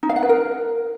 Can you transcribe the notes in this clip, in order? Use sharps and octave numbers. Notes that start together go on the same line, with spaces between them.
D#4
F5
F#5
B4
A#4